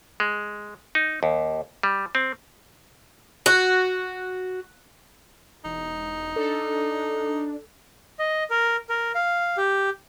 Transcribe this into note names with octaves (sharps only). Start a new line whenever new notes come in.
G#3
D#4
D#2
G3
C4
F#4
E1 D#4
D4 A4
D#5
A#4
A#4
F5
G4